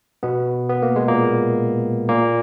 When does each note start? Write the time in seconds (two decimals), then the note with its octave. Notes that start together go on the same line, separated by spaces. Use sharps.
0.23 B2 B3
0.69 B3
0.83 A#3
0.96 G#3
1.08 A#2 A#3
2.09 A#2 A#3